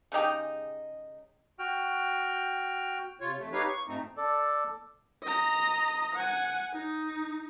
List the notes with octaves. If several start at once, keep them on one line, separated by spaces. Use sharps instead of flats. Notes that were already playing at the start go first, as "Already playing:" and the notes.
C#3 G#3 D#4 G4
F#4 G5 F6
C3 F4 C#5
F2 A3
D#4 G4 B4 C#5 F5
C#6
G#2 F3 A3 C4 D#4
A4 D5
D#5 A#5
F#5 G#5
D#4